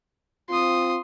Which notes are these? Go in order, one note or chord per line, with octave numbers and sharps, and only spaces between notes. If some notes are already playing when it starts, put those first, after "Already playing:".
C4 F4 C6 D#6